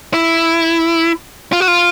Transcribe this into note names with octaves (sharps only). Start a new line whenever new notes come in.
E4
F4
F#4
F4